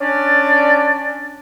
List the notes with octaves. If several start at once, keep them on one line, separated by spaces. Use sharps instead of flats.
C#4 D4 D5